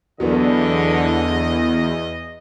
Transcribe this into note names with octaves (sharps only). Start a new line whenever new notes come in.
E2 D3 F#3 B3 D#5